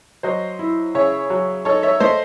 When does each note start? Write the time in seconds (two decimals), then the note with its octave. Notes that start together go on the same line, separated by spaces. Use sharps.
0.23 F#3 C5 D#5
0.59 E4
0.94 C#3 C#5 E5
1.30 F#3
1.65 D#4 A4 C#5
1.83 C#5 E5
2.00 A3 C5 D#5